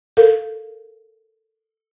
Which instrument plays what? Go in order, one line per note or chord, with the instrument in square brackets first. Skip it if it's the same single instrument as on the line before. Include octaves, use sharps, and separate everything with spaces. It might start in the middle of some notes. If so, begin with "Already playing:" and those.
[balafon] A4 A#4 F5